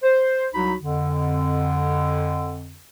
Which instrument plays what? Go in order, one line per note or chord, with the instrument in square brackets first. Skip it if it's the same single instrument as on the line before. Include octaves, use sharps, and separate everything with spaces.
[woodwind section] C5
C2 F#3 D#4 F#4 B5
F2 D3